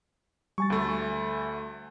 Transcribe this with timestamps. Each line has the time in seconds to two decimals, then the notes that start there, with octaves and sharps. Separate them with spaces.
0.58 G3 G#5 C#6 A6
0.70 D2 A3